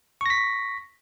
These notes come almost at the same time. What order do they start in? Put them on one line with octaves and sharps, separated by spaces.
C#6 A#6 B6